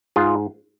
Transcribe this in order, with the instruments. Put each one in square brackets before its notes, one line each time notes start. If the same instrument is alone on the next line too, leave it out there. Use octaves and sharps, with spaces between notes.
[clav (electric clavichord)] G#2 F4 G#4